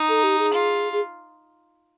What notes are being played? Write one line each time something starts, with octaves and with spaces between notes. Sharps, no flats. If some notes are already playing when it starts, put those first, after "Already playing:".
Already playing: D#4
A4
G4
G#4
F4
G#4